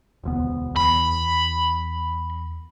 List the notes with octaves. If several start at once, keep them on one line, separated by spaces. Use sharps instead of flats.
E1 D2 B3
E2 B5